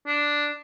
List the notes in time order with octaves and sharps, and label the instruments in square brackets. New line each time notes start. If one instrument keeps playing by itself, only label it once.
[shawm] D4